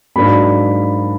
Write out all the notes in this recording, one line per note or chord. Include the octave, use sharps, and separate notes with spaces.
G#2 F#3 A#3 D4 B5